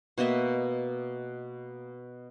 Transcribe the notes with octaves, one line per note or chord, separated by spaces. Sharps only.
B2 A#3 D#5 E5